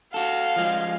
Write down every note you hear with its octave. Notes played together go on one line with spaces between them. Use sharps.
F#4 A4 F5
F3 G#3